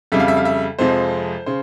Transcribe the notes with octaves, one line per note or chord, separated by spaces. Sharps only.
F2 C#3 G3 E5
F5
E5
F5
E5
F2 C3 F3 G#3 C5
C#3 C5